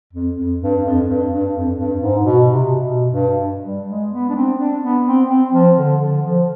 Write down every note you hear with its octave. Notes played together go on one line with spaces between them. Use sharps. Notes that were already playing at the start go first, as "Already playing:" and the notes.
F2
F2
G2
F2
G2
G2
F2
G2
G#2
B2
C3
B2
G2
G3
G#3
B3
D4
C4
D4
B3
C4
C4
F3
D3
D3
F3